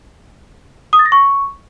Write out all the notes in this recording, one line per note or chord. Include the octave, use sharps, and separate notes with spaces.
D#6
A6
A#6
C#6